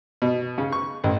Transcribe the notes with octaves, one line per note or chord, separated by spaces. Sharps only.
B2
C#3
C#6
A1